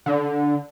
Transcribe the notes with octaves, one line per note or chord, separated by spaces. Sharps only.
D3